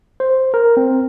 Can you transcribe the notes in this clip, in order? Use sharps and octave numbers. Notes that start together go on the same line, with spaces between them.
C5
A#4
C4